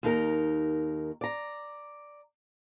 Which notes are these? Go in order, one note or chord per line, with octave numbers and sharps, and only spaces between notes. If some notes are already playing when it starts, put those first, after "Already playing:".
D#2 D#4 A#4
D5 A#5